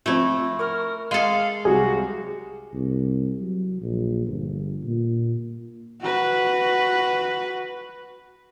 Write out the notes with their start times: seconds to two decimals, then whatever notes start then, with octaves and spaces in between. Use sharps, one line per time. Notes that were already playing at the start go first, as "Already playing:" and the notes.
0.06 F3 A3 C4 E4
0.59 A#4 C#6 F6
1.11 G#3 A4 F5
1.65 C2 C3 F#3 G3 F#4 G#4
2.73 C2
3.40 F#3
3.82 A#1
4.27 G1
4.84 A#2
6.01 F#4 B4